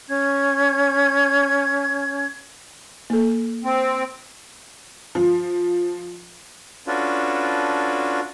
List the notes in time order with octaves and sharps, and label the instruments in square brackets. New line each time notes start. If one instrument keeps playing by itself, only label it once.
[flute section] C#4 G#6
[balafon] A#3 A4
[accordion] C4
[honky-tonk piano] F3
[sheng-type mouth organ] C#4 D4 F4 F#4 A4 B4